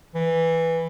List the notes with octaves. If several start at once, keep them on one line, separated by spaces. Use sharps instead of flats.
E3